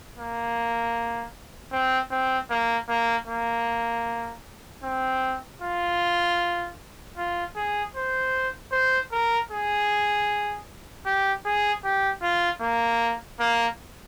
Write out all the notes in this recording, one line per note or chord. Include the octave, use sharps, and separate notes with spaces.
A#3
C4
C4
A#3
A#3
A#3
C4
F4
F4
G#4
C5
C5
A#4
G#4
G4
G#4
G4
F4
A#3
A#3